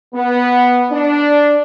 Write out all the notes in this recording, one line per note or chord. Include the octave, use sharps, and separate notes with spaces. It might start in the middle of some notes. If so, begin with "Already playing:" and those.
B3
D4